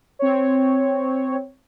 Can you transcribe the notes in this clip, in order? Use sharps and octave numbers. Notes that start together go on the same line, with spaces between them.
C4 C#5